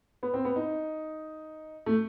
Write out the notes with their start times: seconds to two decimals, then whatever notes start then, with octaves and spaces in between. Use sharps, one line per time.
0.23 B3
0.34 C4
0.45 B3
0.56 D#4
1.86 A3